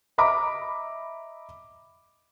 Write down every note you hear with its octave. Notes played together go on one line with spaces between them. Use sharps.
D#5 E5 A#5 B5 D6